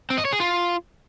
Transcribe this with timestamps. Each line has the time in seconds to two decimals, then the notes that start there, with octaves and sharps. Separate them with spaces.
0.10 C4
0.18 D#5
0.25 C#5
0.33 G#4
0.40 F4